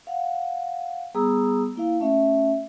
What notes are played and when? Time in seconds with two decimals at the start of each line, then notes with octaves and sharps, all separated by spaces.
0.07 F5 F#5
1.14 G3 B3 G#4 A#5 D#6 E6
1.76 A#3 E4 F5
2.00 A3 C#4 E5